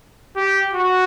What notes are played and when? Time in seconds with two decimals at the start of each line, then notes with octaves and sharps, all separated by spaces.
0.36 G4
0.74 F#4